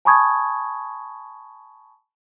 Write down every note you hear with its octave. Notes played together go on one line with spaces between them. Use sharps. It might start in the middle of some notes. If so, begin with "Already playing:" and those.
G#5 A5 B5 C#6 D#6 G#6